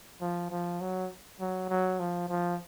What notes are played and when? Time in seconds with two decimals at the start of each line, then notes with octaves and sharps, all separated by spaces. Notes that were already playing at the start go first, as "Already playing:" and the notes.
0.21 F3
0.51 F3
0.81 F#3
1.40 F#3
1.69 F#3
1.99 F3
2.29 F3